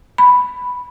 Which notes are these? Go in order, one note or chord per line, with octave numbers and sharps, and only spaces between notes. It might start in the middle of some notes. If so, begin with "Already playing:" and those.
B5